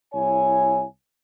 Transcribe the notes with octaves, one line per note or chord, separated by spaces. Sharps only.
C2 E4 C#5 G#5